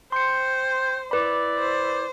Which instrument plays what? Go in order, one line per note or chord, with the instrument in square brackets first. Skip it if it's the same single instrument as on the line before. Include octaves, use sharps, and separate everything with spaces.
[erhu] C5 [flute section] G5 G6 [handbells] C6 C#7
[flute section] E4 D5 D6 [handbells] B4 B5
[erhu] C5